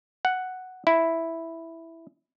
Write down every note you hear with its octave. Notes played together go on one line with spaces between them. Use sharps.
F#5
E4